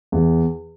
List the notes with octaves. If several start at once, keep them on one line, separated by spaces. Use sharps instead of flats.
E2